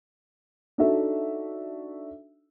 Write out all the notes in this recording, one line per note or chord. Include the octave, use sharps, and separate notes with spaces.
D4 D#4 F#4 A4 E5